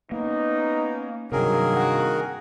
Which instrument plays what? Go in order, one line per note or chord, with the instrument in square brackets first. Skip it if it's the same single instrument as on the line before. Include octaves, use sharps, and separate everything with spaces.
[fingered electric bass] A#3 [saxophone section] B3 C#4 [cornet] D#4
[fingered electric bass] G2 C3 [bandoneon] D#3 G#4 A#4 [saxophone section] F#3 [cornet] A#3
[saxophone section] F#4